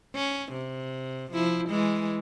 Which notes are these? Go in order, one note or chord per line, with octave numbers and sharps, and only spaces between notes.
C#4
C3
F3 E4
E3 G#3